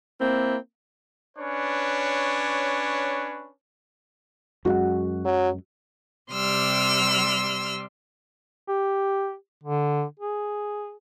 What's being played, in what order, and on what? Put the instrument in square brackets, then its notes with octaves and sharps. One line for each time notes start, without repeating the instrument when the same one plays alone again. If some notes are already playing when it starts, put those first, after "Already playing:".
[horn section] A#3 C4 E4
[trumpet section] C#4 D4 B4 C#5
[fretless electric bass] F#2 G#3 [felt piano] F#4 F#5
[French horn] F#3
[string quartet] C3 G3 C6 E6 F6
[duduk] G4
D3
G#4